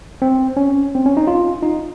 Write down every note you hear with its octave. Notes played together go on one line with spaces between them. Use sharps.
C4
C#4
C4
C#4
D#4
F4
D#4